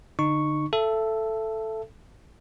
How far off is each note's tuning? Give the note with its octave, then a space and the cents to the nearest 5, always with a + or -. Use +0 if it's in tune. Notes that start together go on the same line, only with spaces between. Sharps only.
D3 +0 D#4 -25 C#6 +0
A4 +0 E5 +30